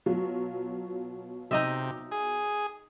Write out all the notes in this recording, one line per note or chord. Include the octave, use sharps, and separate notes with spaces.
B2 F#3 F4
C3 D#4 D#5 E5
G#4